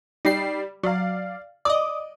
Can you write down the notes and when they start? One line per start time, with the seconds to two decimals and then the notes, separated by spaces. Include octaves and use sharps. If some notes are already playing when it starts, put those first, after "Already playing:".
0.25 G3 D#4 G4 D5 C7
0.83 F#3 D5 F5
1.65 D5 D#5 D6 D#6